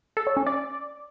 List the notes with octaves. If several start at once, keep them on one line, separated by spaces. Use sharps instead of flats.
A4
C#5
C#4
D5